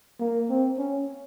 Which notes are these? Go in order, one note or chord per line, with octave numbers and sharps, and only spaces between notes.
A#3
C4
C#4